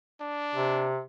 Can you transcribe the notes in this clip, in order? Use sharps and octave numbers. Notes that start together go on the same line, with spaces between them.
D4
C3